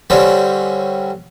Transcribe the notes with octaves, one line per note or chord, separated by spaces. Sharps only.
D3 G3 C4 C#4